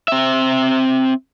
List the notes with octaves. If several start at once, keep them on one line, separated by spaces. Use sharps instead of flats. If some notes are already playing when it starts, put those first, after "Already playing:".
C4 E5